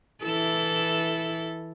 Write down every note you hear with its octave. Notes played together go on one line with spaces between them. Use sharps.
E3 E4 A4